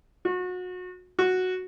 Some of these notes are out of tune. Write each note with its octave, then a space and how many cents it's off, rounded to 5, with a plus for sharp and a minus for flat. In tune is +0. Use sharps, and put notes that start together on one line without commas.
F#4 -30
F#4 -5